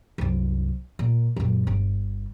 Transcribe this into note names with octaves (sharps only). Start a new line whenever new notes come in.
C2 F#2
A#2
F#2 A#2
G1